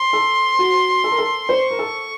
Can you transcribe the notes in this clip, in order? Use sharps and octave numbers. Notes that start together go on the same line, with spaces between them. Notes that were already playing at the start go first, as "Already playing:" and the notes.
Already playing: C6
A4
F#4
A4
A#4
A4
C5 C#6
A#4
A4